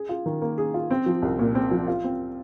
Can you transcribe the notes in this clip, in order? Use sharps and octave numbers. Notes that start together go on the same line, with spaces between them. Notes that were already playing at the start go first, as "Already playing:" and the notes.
Already playing: G#4
F4
D#3
A#3
G#4
F4
C4
F3
C2
A#2
C4
F3
F4
C4